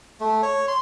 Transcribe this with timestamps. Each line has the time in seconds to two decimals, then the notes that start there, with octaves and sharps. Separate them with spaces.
0.20 A3
0.43 C#5
0.68 C6